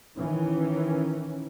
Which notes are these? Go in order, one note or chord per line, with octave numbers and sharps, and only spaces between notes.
D#3 E3 C#4